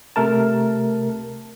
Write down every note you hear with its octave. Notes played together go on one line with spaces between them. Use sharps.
C3 A3 A#4 A5